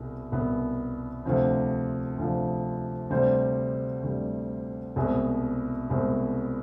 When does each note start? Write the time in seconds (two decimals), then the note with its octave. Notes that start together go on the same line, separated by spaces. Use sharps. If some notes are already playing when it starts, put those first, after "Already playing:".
Already playing: C2 B2 B3 G#4
0.32 C2 B2 B3
1.25 D2 C3 F3 C5
2.18 D2 C3 F3
3.10 D2 C3 G3 C5
4.03 D2 C3 G3
4.96 C2 B2 G#3 C4 G#4
5.90 C2 B2 G#3 C4